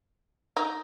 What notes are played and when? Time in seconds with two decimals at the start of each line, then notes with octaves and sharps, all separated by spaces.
0.57 D#4